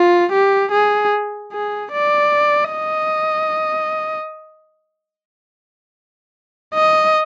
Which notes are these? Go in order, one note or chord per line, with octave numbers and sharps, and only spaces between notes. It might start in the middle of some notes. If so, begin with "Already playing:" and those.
Already playing: F4
G4
G#4
G#4
D5
D#5
D#5